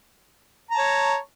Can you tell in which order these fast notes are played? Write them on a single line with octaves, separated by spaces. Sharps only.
A#5 A5 C#5